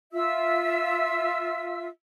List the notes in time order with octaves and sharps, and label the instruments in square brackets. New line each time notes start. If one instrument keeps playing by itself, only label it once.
[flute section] F4 E5 E6